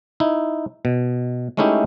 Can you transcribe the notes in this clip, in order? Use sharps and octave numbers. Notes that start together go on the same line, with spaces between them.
D#4 E4
B2
G#3 A3 C#4 D#4 E4 G4